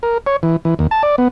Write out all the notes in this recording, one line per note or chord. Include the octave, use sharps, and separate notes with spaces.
A#4
C#5
E3
E3
D#2
A5
D5
B3